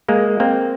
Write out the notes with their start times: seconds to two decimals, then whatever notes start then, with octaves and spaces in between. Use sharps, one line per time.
0.09 G#3 A#3
0.40 A#3 C4